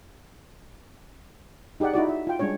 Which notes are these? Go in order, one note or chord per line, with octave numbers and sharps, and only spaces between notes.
D#4 G4 G#4 D5 F#5
D#4 E4 F#4 D5
E5
F4 G5
G3 G#3 C#4 D4 C#5